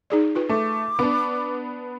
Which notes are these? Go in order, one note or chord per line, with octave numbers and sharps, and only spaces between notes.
D#4 G#4 D5
F4 B4
A3 D6
B3 D4